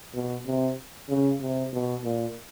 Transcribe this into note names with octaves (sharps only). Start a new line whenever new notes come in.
B2
C3
C#3
C3
B2
A#2